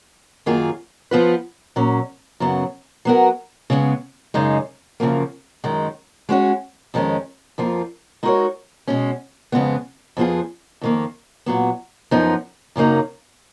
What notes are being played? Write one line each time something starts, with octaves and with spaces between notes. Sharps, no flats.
F#2 D#3 A#3 F4 G#4
F3 B3 F4 B4
A#2 F#3 C#4
F#2 C#3 F#3 B3
F#3 B3 F#4 A#4
C#3 G#3 B3
F#2 C#3 G#3 D#4
F#2 C#3 F3 A#3
F#2 D#3 G#3
G#3 C#4 F#4 C#5
F2 D#3 G#3 C#4
F2 F3 A#3 F4
G#3 D#4 F#4 A#4 C#5
B2 G#3 C#4
F2 C#3 G#3 B3
F2 F3 B3 F4 G#4
F2 D#3 A#3
A#2 F#3 B3
F#2 F3 B3 D#4
F#2 C#3 F#3 A#3 D#4